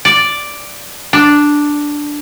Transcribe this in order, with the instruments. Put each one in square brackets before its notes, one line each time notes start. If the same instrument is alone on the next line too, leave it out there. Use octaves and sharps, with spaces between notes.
[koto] D5
D4